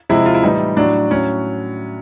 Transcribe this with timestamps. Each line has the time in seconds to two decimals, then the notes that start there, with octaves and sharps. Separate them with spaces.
0.09 C3 F3 G#3 E4
0.26 F4
0.35 E4
0.43 A2 E3 G3 D#4
0.77 A2 F#3 D4
1.11 A2 F#3 C#4